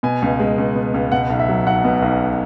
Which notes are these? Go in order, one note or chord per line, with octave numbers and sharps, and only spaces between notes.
B2 G#5
C#2
G#3
C#2
B2
C#2
B2 F#5
B1
E5
F#3
B1 F#5
B2
B1